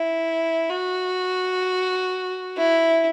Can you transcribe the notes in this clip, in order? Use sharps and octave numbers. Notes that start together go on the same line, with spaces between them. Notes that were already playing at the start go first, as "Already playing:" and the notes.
Already playing: E4
F#4
E4